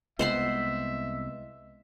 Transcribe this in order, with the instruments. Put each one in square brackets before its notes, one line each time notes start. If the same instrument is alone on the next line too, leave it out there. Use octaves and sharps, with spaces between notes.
[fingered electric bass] C2 G#3 B3 [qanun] C5 F#5 C6 [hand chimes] D#5 [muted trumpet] E5